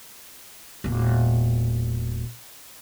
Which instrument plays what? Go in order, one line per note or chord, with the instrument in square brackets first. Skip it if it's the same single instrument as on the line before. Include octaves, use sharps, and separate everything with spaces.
[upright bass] E1 A#2